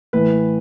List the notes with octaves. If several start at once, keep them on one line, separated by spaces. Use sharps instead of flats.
A2 E3 B4